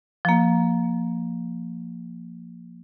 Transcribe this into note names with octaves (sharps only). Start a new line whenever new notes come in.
F3 A#3